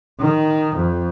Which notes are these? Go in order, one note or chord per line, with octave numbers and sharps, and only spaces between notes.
D#3
F2